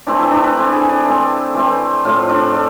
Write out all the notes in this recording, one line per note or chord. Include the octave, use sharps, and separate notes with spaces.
E3 A3 C4 D4
E4
D4
B4
E3 A3 C4
G#4
D4
E3 A3 C4
E3 A3 C4
A2 F3 A3 F4
D4
A3 A4